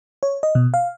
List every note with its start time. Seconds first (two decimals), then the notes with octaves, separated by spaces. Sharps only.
0.23 C#5
0.43 D#5
0.55 B2
0.74 F5